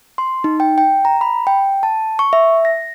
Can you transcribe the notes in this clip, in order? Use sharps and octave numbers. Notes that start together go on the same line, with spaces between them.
C6
D#4
G5
G5
A#5
B5
G5
A5
C#6
E5
A#6